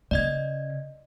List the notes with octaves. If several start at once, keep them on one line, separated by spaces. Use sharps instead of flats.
C#3 D5 D#5 G#6